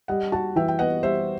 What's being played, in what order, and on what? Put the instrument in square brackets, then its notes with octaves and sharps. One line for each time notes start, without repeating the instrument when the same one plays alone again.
[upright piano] G3 [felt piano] D#5 F#5
[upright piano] F#4 [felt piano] F#5 A5
[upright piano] E3 [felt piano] E5 G5
[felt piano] G5
[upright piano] B3 [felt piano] D#5 F#5
[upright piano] G3 [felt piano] C5 E5